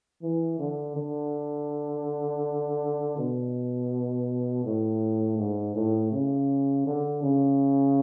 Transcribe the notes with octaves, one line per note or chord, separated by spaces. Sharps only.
E3
D3
D3
B2
A2
G#2
A2
C#3
D3
C#3